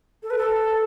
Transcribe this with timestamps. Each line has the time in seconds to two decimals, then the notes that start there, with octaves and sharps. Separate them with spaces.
0.23 A4
0.30 B4
0.38 A4